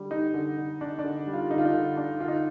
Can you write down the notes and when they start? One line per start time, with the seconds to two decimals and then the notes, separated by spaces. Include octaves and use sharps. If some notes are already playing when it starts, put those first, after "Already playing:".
Already playing: D3 G3
0.11 G3 D#4
0.34 D3
0.58 D3
0.81 D4
0.99 D4
1.04 D3
1.27 G3
1.34 F4
1.50 D3 D#4
1.58 F4
1.65 D#4
1.73 D3
1.97 D4
2.20 D3 F4
2.28 D#4